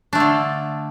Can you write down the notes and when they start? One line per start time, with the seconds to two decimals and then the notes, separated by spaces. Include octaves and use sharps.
0.13 D4
0.15 A3
0.18 F4
0.20 D3